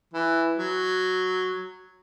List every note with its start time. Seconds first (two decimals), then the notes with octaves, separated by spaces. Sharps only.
0.13 E3
0.57 F#3